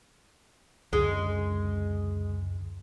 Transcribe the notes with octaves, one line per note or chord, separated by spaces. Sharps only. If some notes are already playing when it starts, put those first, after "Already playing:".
C#2 F#2 D3 G#3